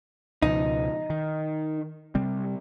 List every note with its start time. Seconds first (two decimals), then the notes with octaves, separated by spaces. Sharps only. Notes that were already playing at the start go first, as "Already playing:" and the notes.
0.42 C#2 B2 F3 D#4
1.10 D#3
2.15 C3 G3 C4